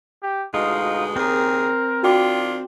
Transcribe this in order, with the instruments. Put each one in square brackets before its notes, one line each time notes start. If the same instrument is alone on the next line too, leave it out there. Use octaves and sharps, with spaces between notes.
[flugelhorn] G4
[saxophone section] D2 B2 G#3 [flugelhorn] D#4 [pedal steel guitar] F4
[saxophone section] D#2 C#3 G#4 [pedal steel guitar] C4 [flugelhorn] A#4
[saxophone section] D#3 D4 F4 [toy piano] F#4 G5 D6